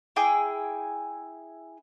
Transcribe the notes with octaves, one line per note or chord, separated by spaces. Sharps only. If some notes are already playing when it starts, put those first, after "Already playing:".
E4 G#4 G5 D6